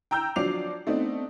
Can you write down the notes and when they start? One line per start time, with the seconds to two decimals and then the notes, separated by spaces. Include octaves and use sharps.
0.11 G5 A#5 E6 G6
0.36 F3 F#3 D4 D6 C7 F7
0.87 A3 B3 C4 D4 D#4